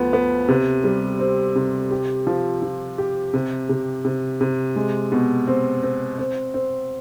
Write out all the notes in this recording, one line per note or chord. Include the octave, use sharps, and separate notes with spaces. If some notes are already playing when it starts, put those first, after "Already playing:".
Already playing: D2 F3 B3
B3
C3
G3
C4
C3
G4
F3
F3
G4
C3
C3
C3
C3
G#3
B2
C4
C4
C4
C4